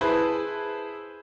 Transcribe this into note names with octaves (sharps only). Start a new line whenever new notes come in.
E4 G#4 B4 C5 A5 B5